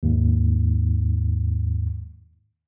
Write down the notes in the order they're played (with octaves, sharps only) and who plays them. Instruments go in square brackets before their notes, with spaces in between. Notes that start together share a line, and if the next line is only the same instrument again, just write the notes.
[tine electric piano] D#2 G#2